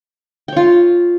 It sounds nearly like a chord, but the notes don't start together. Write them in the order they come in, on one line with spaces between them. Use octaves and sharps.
G5 C#5 F4